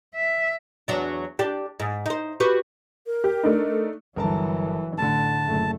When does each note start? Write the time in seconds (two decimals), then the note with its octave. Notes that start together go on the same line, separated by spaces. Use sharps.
0.15 E5
0.88 E2 F#3 D4
1.39 D4 G4
1.80 G#2
2.06 D#4 C5
2.40 F#4 G4 B4
3.07 A#4
3.24 G4
3.43 A3 D4 D#4
4.16 G1 E3 F#3 A#4 A5
4.98 A1 A2 D3 A5
5.44 F#1 A3